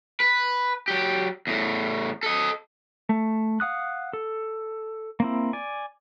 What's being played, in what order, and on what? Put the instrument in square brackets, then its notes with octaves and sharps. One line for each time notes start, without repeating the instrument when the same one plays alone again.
[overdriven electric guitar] B4
F#3 G4
E2 A2
A4 D#5
[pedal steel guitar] A3
F5 F#5 D#6 F#6
A4
A#3 C4 E4
D5 G#5